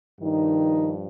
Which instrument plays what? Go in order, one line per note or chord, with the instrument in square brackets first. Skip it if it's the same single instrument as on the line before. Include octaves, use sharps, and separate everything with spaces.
[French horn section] G2 D#3 F3 D#4